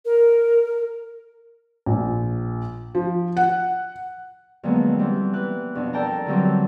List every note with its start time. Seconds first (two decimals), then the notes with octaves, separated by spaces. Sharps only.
0.05 A#4
1.86 A#1
2.95 F3
3.37 F#5
4.63 F2 D3 F#3 G#3 A#3 B3
4.99 E3 G3 B3 C4
5.33 E3 B4 F#6
5.75 F2 B2 D4
5.93 A4 A#4 D5 G5 A5 A#5
6.26 D3 E3 F#3 G3 C4